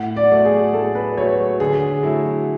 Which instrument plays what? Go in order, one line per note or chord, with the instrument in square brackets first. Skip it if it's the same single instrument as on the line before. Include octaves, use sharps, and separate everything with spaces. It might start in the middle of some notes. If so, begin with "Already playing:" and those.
Already playing: [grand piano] A2 [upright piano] F#5
[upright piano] D5
[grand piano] F#3 A3
[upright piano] G#4
[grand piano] A2 [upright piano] A4
[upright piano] B4
[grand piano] F#3 A3 [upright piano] C#5
[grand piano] D3 [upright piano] G#4
[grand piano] F#3 A3 E4